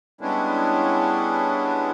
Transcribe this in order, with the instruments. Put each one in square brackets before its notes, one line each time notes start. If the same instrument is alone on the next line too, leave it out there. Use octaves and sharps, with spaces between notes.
[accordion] G3 G#3 B3 C#4 D4 E4